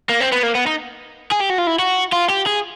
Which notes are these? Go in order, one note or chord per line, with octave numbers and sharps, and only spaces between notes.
A#3
C4
B3
A#3
B3
D#4
G#4
G4
F#4
F4
E4
F#4
F4
G4
G#4